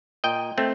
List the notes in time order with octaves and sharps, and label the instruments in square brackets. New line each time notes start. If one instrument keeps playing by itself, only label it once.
[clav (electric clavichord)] A#2 D#5 G5
A3 C4